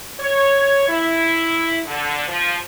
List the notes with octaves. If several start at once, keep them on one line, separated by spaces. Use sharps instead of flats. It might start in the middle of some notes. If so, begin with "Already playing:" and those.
C#5
E4
D3
F3